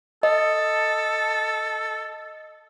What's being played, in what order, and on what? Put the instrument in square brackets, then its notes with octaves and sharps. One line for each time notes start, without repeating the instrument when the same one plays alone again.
[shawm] A4 [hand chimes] D#5